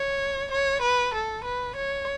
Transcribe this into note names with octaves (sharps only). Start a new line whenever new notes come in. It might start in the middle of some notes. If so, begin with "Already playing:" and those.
Already playing: C#5
C#5
B4
A4
B4
C#5